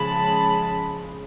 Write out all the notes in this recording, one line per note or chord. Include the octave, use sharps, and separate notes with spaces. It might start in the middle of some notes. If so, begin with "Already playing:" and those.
Already playing: C#3 F3 G#3 A5 B5